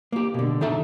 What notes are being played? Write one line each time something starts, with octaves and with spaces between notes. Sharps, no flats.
A#3 G4
B2 D3
D#3 D#4 A4 E5